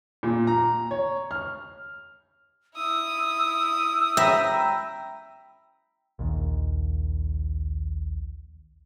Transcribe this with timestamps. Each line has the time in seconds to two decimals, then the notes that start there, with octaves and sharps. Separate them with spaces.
0.23 A#2
0.47 A#5
0.91 C#5
1.31 F6
2.76 E4 D#6 E6
4.17 E5 G5 A#5 B5
6.19 A#1 D#2